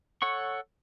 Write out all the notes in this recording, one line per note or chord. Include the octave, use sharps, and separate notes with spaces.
A4 C#5 F#5 C#6